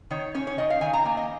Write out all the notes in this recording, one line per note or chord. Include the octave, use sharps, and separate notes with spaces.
D#3 C#5
C#4 C#5
C#5
D#3 D#5
F5
D#3 G#5
A#5
A#3 G#5
D#5